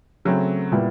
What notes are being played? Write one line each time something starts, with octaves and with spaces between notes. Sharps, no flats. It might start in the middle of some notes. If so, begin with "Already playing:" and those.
C#3 F#3 A3 C4
A#2 G3 B3 E4